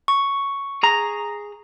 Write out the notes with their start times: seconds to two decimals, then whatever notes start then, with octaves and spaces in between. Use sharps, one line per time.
0.08 C#6
0.83 G#4 A#5